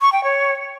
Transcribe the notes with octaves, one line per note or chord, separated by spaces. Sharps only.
C#6
G5
C#5